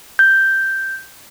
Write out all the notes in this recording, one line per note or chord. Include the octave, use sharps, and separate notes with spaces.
G6